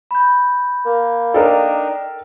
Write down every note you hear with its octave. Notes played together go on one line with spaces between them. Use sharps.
B5 G6
A#3
D4 D#4 A4 A#4 G5